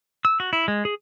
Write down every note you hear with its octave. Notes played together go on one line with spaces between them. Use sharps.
E6
F#4
E4
G#3
G#4